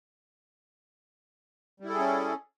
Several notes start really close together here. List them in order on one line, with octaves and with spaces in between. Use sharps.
G3 E4 A4 G#4 C#4